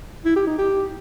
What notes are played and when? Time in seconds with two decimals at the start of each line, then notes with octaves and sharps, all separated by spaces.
0.25 E4
0.36 G4
0.47 D#4
0.58 G4